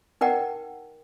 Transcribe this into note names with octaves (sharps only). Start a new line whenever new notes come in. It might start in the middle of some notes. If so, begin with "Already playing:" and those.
D#4 A#4 D5 F#5 G5